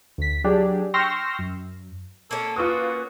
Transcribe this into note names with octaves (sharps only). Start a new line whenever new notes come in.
D2 B6
F#3 D4 G4 G#4
G5 C6 C#6 E6 F6 A#6
F#2
A#3 C#4 A4
F4 F#4 B4 D6 D#6